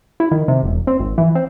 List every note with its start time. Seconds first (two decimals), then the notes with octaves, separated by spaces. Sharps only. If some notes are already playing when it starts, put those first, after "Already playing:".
0.20 E4
0.31 D#3
0.48 C3
0.63 E1
0.87 C4
1.00 G#1
1.18 E3
1.35 C4